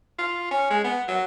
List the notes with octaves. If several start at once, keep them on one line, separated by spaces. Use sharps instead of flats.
F4
C#4
G#3
B3
F#3